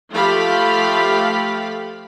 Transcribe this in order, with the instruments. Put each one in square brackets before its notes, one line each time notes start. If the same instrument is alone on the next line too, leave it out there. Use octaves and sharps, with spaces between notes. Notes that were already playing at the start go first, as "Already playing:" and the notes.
[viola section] F3 A3 G4 F5 B5